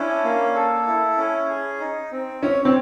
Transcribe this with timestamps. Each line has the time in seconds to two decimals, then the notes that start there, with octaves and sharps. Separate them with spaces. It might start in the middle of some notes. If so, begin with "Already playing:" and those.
Already playing: C#4 D4 E4
0.24 A#3
0.55 A4
0.87 E4
1.18 C#4
1.48 G#4
1.80 D#4
2.11 C4
2.42 C#4 C#5
2.65 C4